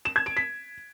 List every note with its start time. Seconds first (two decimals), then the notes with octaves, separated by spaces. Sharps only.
0.05 E7
0.16 G#6
0.26 D7
0.37 B6